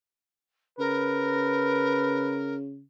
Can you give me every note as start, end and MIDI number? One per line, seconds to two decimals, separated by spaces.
0.79 2.83 49
0.79 2.54 70
0.79 2.42 71